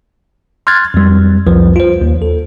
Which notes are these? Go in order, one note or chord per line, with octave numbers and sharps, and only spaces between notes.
C6 F6 F#6 G#6 A6
F2 G3
C2 F2 F3 B4
F4 C5
D#2
A4